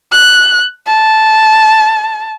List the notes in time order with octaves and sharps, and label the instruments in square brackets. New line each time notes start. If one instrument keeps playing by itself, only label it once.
[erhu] F#6
A5